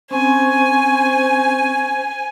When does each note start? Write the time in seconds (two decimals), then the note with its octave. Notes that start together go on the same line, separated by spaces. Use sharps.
0.11 C4 C#4 C5 G#5 C#6